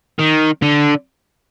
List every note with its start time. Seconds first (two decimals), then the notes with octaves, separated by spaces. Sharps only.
0.19 D#3
0.62 D3